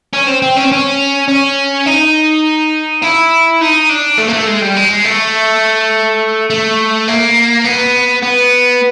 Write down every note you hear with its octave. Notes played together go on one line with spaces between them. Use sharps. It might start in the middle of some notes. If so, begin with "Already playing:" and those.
C#4
C4
C4
C#4
C4
C#4
C#4
D#4
E4
D#4
D4
A3
A#3
A3
G#3
G3
G#3
A3
A3
A#3
B3
B3